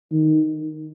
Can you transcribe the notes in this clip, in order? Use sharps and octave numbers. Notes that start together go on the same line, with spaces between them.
D#3